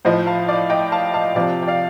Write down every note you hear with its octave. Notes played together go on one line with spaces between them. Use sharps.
A2 F3 C5 D#5
F5 A5
D5 F5
D#5 G5
F5 A5
F5 A5
C3 F3 D5 F5
G5
D5 F5